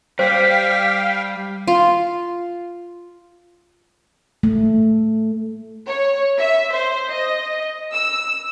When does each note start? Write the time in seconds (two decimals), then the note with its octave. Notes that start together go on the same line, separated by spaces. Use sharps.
0.19 G3 C5 F5 G5 B6
1.68 F4
4.43 A3
5.88 C#5
6.38 E5
6.73 C5
7.09 D#5
7.92 E6